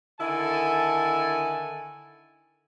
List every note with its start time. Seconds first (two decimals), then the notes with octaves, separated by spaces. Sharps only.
0.19 D3 D#3 E4 A4 G#5